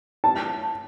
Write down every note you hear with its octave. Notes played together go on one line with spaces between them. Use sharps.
A5